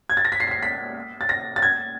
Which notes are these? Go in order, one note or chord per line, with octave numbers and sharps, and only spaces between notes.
G#6
A6
A#6
B6
C7
B6
C7
B6
A6
A#6
A6
G#6